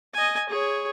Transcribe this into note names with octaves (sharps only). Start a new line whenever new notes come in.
D#5 G#5
G#4 C#5